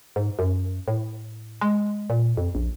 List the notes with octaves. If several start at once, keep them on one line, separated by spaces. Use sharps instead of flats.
G#2
F#2
A2
G#3
A#2
F2
A#1